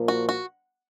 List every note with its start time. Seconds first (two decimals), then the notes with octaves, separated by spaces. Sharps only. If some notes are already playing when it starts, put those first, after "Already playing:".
Already playing: A#2 F3 A#3
0.08 F#4
0.29 F#4